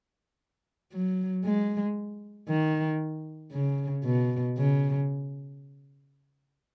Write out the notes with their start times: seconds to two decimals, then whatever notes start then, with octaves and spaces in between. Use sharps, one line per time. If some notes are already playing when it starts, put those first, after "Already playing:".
0.92 F#3
1.45 G#3
2.49 D#3
3.52 C#3
4.05 B2
4.58 C#3